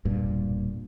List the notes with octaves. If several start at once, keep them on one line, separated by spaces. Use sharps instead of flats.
E1 G2 A#2